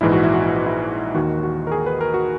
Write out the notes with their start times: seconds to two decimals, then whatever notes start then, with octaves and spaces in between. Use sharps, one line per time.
0.01 A#1 G#2 E3 E4
0.13 F#4
0.23 E4
0.34 F#4
0.44 E4
0.55 F#4
0.66 E4
1.15 D#2 D#3 F#4
1.43 F#4
1.67 A#4
1.72 G#4
1.86 B4
2.01 A#4
2.14 F#4